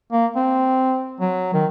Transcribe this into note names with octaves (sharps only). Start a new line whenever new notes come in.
A#3
C4
F#3
D#3